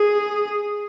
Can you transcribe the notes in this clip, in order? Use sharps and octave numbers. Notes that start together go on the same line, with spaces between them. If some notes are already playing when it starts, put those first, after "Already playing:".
Already playing: G#4